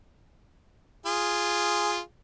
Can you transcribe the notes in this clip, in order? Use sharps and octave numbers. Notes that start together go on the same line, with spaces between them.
F4 G#4